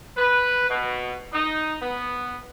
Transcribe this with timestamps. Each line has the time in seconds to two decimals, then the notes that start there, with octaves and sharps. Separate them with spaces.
0.17 B4
0.70 B2
1.33 D#4
1.82 B3